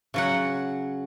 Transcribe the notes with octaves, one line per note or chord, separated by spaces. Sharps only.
C#3 F#3 F#5